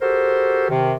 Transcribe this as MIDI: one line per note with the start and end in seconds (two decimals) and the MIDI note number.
0.02 0.66 66
0.02 0.66 67
0.02 0.66 69
0.02 0.66 70
0.02 0.66 72
0.69 0.95 48
0.69 0.95 51